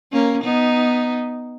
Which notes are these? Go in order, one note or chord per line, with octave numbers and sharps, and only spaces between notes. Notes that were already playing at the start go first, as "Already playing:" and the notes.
A#3 C#4
B3 D#4